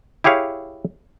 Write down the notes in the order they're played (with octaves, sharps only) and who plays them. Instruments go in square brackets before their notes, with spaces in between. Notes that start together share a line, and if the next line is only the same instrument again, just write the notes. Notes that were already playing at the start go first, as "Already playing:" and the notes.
[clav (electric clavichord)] E4 G4 G#4 C#5 F5